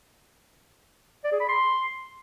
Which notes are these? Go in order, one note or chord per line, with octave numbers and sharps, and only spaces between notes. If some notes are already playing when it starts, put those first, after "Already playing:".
D5
G#4
B5
C6